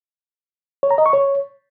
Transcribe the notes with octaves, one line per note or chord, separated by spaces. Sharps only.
C#5
A#5
D#5
C#6
C#5